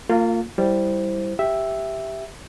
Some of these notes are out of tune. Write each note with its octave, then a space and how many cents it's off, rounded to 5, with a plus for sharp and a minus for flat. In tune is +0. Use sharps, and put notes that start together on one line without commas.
A#3 -35 F4 +0
G3 +0 E4 +0 C5 +0
G4 +0 E5 +0